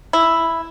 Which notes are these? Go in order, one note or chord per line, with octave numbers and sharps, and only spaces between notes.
E4